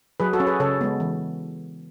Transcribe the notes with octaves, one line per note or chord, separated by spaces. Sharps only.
F#3 G#4 B4
F#4 A4
C#4
G#4 B4
C#3 A4 C#5
G#3 B3
E3